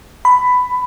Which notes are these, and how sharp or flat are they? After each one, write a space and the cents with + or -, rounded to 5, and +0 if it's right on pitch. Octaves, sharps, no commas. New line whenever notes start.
B5 +10